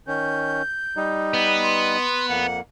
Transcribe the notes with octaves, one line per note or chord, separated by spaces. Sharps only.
D#3 C#4 G6
G3 D#4
B3
C6
F2 A#3 F#5